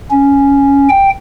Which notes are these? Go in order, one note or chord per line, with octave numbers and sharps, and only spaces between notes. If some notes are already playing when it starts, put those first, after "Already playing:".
C#4
G5